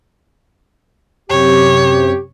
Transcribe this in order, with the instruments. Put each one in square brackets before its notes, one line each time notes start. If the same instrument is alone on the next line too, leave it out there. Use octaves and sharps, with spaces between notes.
[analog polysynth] F#2 C3 [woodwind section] G4 [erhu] C#5